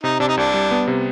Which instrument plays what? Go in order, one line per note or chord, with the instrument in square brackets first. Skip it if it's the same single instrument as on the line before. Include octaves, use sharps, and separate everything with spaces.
[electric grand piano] C3 [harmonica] D#4
[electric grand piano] C3 [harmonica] D4
[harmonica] D#4
[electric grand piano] C2 [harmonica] D4
[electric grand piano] G3
B3
C3